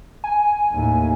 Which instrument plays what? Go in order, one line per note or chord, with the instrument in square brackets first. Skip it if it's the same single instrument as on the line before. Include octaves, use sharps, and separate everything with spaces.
[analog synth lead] G#5
[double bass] D#2 A2